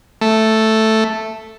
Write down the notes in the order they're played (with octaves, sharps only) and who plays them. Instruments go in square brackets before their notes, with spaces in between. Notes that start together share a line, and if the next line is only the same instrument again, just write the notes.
[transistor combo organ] A3